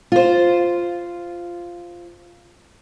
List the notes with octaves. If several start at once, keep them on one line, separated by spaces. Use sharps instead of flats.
F4 C5